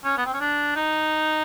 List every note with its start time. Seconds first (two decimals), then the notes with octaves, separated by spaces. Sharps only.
0.04 C#4
0.18 B3
0.26 C4
0.33 C#4
0.40 D4
0.76 D#4